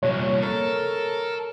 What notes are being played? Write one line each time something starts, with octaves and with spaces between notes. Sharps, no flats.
C2 A#2 C#5
A4 A#4